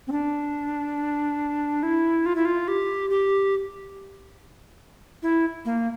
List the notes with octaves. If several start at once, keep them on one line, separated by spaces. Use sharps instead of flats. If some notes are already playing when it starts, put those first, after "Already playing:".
C4
D4
E4
F4
E4
F4
G4
G4
E4
A#3